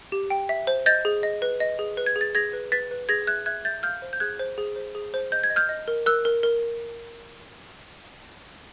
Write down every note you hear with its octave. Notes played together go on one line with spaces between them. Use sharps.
G4
G5
E5
C5
D#5 G6 A6
G#4
D#5
B4
D#5
G#4
B4
G#6
G#4
A6
G#4 G#6 A#6
B4
B4 A6 B6
B4
G#4 G#6 A#6
E5 F#6 G#6
E5 F#6 G#6
E5 G6 A6
F5 F6 G6
C5
G6
G#4 F#6 G#6
C5
G#4
C5
G#4
C5
D#5 G6
G#6
D#5
F6 G6
D#5
A#4
A#4 E6 F#6
A#4
A#4